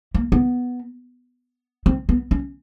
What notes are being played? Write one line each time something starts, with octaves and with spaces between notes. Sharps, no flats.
A#3
B3
C4
B3
C#4